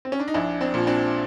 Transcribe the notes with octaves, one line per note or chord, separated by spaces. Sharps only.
C4
C#4
D4
D#4
A#1 D4 E4
C4 D4
A#2 F3
C4 D4